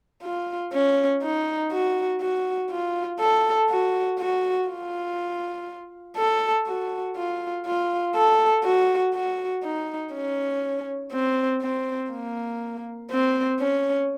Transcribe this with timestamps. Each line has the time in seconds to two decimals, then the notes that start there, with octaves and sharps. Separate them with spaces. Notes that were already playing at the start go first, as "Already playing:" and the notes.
0.23 F4
0.72 C#4
1.22 D#4
1.72 F#4
2.21 F#4
2.71 F4
3.20 A4
3.70 F#4
4.19 F#4
4.69 F4
6.17 A4
6.67 F#4
7.16 F4
7.66 F4
8.15 A4
8.64 F#4
9.14 F#4
9.63 D#4
10.14 C#4
11.12 C4
11.62 C4
12.11 A#3
13.11 C4
13.60 C#4